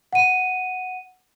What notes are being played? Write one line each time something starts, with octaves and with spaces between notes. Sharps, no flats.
F#5 D#7